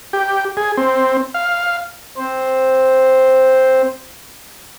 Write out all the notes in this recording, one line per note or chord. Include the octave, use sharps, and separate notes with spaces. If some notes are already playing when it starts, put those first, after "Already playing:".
G4
G#4
C4
F5
C4 C5